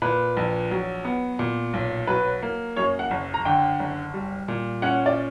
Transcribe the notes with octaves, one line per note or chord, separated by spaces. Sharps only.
A#2 B4
A#1
F#3
B3
A#2
B1
F#3 B4
A#3
F#2 C#5
F#5
F#1
A#5
D3 G5
F#1
G3
A#2
C#4 F#5
D5